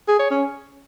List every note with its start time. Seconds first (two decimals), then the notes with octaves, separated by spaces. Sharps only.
0.08 G#4
0.19 C#5
0.31 C#4